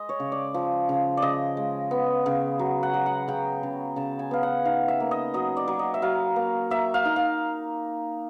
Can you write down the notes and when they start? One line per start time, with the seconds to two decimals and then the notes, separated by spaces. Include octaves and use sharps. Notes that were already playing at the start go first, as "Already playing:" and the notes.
Already playing: G#3 D#5
0.09 C#5
0.20 C#3
0.32 D5
0.54 F3
0.89 C#3
1.17 C#3 D5 D#5
1.57 G#3
1.91 B3
2.26 C#3
2.59 F#3
2.83 F#5
2.94 F#3
3.06 F#5
3.28 C#3 G5
3.63 C#3
3.96 C#3 A5
4.19 G#5
4.31 B3 F5
4.43 F#5
4.65 D#4 F5
4.88 E5
5.00 A#3
5.11 D#5
5.34 F#3 D#5
5.57 D5
5.68 F#3
5.79 D#5
5.94 E5
6.02 F#3 F5
6.36 A#3
6.71 A#3 E5
6.94 F5
7.05 D#4
7.16 F5